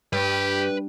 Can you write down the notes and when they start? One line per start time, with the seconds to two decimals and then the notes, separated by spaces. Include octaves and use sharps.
0.13 G2 G4 B4